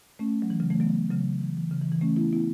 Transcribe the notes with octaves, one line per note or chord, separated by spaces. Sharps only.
A3 C#4
F#3
E3
C#3 F#3
E3 A3
F#3 B3
C#3 F#3
E3
E3
C#3
E3
E3
A3 C#4
B3 E4
B3 E4